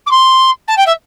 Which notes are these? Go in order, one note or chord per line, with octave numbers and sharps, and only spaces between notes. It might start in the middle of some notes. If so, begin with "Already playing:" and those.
D6
C6
A5
G5
E5